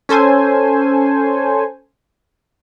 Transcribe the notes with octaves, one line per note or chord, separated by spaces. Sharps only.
C#4 A4 C5 G#5